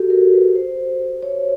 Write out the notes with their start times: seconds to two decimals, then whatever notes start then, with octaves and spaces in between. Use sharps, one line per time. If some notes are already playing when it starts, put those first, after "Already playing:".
Already playing: F#4 G4 A4
0.10 A#4
0.33 B4
0.55 C5
1.23 C#5